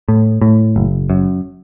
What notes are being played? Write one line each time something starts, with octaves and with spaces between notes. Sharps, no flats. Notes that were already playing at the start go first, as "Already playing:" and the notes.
A2
A2
F#1
F#2